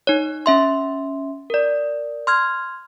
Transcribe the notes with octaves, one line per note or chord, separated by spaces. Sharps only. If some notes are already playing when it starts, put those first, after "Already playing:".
D#4 C#5
C#4 E5 C6
A#4 D5
C6 F6 G#6